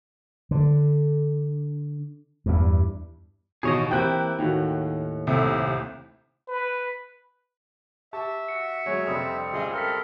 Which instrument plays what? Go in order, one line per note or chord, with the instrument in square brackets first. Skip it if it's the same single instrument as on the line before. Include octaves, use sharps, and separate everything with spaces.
[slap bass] D3
E2 G2
[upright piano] A1 D#2 [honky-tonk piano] B2 [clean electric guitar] G#4 C#5 D#5
[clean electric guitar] E3 A#3 E4 [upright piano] C4 G4 [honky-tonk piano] G5 F#6
[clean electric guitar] D#2 A2 [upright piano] D#3 F#4
[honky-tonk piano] C2 C3 [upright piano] A3
[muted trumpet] B4
[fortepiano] G4 A5 C#6 [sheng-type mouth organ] E5
[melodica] F#4 [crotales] C#7
[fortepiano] F#3 G#3 [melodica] C#4 C#5
[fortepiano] F2 C3 D4 [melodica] G3 C4 [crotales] D#6
[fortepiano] C#2 E5 [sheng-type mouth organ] F4 G#4 D#5
[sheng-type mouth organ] A4 A#4 [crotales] F6 B6